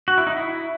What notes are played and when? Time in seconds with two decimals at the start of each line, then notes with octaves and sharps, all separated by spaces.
0.08 F#4
0.18 E4
0.27 D#4
0.37 E4